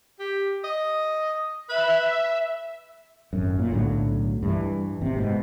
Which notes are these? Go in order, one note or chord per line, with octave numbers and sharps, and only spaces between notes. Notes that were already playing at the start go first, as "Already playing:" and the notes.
G4
D#5
B4 E5
G#1 F#2
A#2
B1 A2 D3 F#3
G2 E3
G#1 C3
G#2 B2